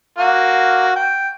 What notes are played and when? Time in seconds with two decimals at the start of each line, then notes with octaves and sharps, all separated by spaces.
0.19 A#3 F#4
0.96 G5